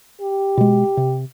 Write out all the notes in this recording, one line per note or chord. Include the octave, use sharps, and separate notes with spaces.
G4
B2 G#3
C3